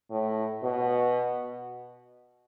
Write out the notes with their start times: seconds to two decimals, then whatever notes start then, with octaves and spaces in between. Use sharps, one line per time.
0.10 A2
0.63 B2